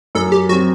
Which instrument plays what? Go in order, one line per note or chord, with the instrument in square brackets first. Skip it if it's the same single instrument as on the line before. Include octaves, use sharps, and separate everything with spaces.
[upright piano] F#2 [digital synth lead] A4
[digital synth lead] G4
[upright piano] F#3 [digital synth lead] F#4
[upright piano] C4